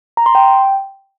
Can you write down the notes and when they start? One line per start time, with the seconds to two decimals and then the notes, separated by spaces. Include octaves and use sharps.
0.17 A#5
0.26 C6
0.35 G5